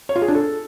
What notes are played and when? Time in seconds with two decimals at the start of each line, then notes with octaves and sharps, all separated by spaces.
0.09 C#5
0.16 F4
0.22 G#4
0.28 D4
0.35 A4